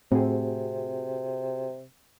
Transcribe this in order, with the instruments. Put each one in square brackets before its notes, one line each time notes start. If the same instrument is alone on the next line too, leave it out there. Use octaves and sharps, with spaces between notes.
[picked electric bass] A2 [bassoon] C3 [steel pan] C4 [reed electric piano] F#4 G#4